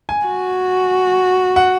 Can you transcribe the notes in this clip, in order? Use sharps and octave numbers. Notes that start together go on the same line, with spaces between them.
G#5
F#4
F#5